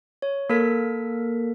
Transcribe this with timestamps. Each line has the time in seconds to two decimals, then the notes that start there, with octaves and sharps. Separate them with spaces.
0.22 C#5
0.50 A#3 A4 A#4 B6